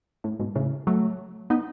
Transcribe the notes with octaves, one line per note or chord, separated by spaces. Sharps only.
A2
G#2 B2
A2 C#3
F#3 A3
B3 D#4